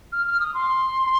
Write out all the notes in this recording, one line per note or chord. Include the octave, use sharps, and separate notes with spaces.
F6
F6
D#6
C6